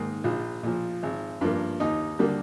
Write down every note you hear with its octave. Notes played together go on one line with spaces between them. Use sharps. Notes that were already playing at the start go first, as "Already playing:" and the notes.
Already playing: G#2 D#3 A#3
A#1 F4
A#2 F3
G#1
G2 F3 A#3
D#2 D#4
D3 G3 A#3